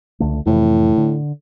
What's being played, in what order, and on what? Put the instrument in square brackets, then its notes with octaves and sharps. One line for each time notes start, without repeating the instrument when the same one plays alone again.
[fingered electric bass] C#2 D3 A3
[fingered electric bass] F2 C3 E3 [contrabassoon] A2
[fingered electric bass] D3